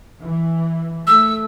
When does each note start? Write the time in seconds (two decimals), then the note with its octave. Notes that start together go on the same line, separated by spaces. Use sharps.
0.22 E3
1.07 A3 E6